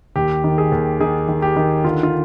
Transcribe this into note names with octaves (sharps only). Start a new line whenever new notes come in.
D#2 G4
D#3
G#4
D#2
D#3 G#4
D#3
G4
D#3
D3 F4
F4